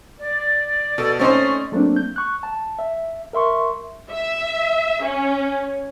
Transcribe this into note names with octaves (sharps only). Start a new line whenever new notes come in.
D5
B2 A4
A3 C4 C#4 D#4 C5 C#6
F#3 A3 A#3 C4 D4
G6
C#6 F#6
A5
E5
A#4 E5 C6 C#6
E5
C#4